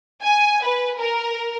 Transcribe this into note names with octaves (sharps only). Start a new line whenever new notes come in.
G#5
B4
A#4